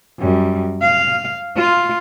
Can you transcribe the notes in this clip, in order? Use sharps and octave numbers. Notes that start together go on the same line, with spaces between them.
F#2 G3
F5
F4